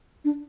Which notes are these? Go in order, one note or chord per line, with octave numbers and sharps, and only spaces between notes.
D4